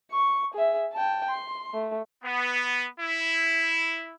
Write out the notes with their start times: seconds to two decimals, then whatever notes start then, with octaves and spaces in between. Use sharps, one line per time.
0.12 C#6
0.54 G#4 E5
0.93 G5 A5
1.30 C6
1.74 A3
2.24 B3
2.99 E4